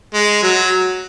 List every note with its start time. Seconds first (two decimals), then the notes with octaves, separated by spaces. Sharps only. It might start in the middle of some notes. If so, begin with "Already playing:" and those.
0.14 G#3
0.43 F#3